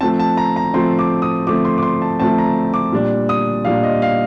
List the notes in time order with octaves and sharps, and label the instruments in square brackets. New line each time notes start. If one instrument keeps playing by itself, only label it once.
[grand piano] F3 A3 C4 A5
A5
A#5
A#5
F3 A3 C4 C6
D6
D#6
F3 A3 C4 D6
C6
D6
C6
A5
F3 A3 C4 A5
A#5
D6
A#2 G3 D4
D#6
A#2 G3 D4 F5
D#5
F5